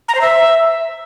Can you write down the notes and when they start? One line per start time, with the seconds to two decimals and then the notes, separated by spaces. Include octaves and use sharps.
0.08 A#5
0.15 C5
0.21 E5